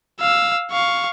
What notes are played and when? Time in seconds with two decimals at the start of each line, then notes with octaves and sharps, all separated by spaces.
0.21 F5 E6
0.71 F5 C#6